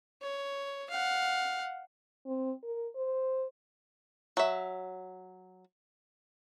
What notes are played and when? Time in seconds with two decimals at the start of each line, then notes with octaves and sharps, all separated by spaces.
0.22 C#5
0.90 F5 F#5
2.26 C4
2.63 A#4
2.96 C5
4.37 F#3 E5